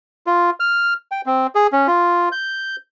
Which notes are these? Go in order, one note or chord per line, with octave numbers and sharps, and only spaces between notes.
F4
F6
G5
C4
G#4
C#4
F4
G6